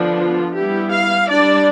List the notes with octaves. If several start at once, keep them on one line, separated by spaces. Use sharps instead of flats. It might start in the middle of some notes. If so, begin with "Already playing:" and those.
Already playing: D3 F3 B3 D4
F4
G3 B3 E4 G4
F5
G3 D4 D5